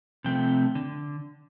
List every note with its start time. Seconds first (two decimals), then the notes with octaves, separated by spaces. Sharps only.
0.24 C3 F3 A3 C4 G5
0.75 D3